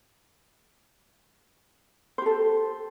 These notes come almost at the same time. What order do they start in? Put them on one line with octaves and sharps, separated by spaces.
C5 G4 A4